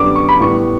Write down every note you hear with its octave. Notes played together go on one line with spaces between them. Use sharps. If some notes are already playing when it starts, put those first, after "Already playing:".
Already playing: F#2 D3 G3 B3 D6
C#6
B5
A2 G3 B3 C#6